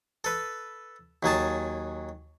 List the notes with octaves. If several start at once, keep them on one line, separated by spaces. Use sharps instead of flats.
A4 B4
D#2 F#3 G#4 A5